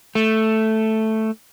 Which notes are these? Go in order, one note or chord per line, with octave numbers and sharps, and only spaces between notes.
A3